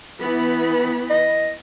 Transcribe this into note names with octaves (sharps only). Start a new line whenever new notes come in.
E3 B3 B5
D#5